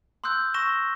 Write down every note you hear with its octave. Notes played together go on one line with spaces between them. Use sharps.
C6 D#6 E6 F#6 G6
C#6 E6 A#6 E7 G7